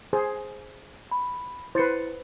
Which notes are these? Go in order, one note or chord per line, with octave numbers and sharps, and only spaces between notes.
G#4 C5
B5
E4 B4 C5 A6 C#7